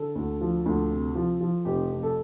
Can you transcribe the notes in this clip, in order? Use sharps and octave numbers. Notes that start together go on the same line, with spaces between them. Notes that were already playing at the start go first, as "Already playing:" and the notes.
Already playing: D3 A4
D2
F3
D2
C3
F3
F3
F1 G4
F2
A4